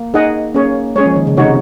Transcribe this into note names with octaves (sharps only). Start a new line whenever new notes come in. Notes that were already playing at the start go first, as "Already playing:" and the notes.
Already playing: A#3
D#4 G#4 D#5 F#5
A#3 C#4 G#4 C#5
G#3 C#4 G#4 C#5
F3
D#3
C#3
C3 G#3 D#4 F#4 C#5